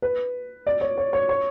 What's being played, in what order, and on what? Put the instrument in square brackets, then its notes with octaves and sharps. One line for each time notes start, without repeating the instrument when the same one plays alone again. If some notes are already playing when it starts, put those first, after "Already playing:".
[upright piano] B4
D5
C#5
C#5
C#5
C#5